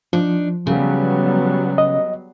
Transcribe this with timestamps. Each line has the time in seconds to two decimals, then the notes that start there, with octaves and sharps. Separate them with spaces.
0.13 F3 D4 D#4
0.67 C#3 F#3 G3 B3
1.78 D#5